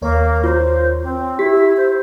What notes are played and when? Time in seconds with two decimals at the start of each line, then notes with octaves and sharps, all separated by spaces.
0.02 D#2 A#3 A#4 C#5
0.44 F4 C5
1.03 C4
1.39 E4 G4 B6
1.77 C5